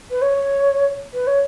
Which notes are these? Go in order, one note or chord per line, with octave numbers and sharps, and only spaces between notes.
B4
C#5
B4
C#5